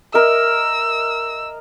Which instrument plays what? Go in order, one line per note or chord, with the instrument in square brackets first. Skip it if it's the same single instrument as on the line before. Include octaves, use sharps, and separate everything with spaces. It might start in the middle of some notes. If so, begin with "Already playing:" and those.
[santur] A#4 D#5 E5 [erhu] E6